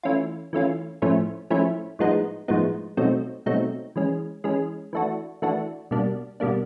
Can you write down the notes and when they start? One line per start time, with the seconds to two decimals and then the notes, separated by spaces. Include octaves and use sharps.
0.03 E3 A3 C#4 F4
0.53 E3 A3 C#4 F4
1.02 A2 F3 A3 C#4 E4
1.50 A2 F3 A3 C#4 E4
1.99 A2 F3 G#3 B3 D#4
2.48 A2 F3 G#3 B3 D#4
2.97 B2 F#3 A3 C4 D#4
3.46 B2 F#3 A3 C4 D#4
3.96 E3 G#3 C#4
4.44 E3 G#3 C#4
4.93 E3 A3 D4 F#4
5.42 E3 A3 D4 F#4
5.91 B2 G3 A#3 D4
6.40 B2 G3 A#3 D4